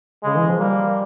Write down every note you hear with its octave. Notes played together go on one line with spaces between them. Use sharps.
C#3 G#3
E3
F3
G3 A#3